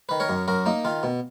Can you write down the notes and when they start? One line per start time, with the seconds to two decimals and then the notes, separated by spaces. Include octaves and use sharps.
0.09 D#3 B4
0.20 A#4 C#5
0.29 F#2
0.48 F#2 F#4 A#4
0.66 A#3 D#4
0.85 D#3 F4
1.03 B2